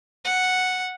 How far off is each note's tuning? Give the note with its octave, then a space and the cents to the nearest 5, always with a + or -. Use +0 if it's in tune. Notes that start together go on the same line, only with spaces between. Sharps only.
F#5 -5